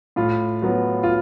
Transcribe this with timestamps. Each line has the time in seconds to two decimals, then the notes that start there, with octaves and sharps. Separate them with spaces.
0.16 A2 F4
0.62 F#3 B3
1.03 F4